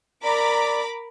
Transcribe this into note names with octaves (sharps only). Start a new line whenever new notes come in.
A#4 D5 A#5 B5 D6